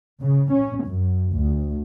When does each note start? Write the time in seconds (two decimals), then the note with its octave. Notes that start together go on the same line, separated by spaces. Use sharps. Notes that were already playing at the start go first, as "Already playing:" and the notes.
0.21 C#3
0.52 C#4
0.85 F#2
1.33 D2